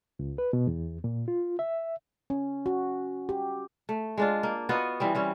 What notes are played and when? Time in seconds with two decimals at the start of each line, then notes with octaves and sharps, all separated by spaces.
0.19 C#2
0.38 B4
0.53 B2
0.67 E2
1.04 A#2
1.28 F4
1.59 E5
2.30 C#4
2.66 F#4
3.29 G4
3.89 A3
4.18 G#3 D4 F4
4.43 A#3
4.69 B3 F4 F#4 D#5
5.00 E3 G3 C4
5.15 G3 C4 C#4